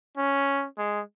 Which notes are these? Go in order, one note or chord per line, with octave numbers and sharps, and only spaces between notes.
C#4
G#3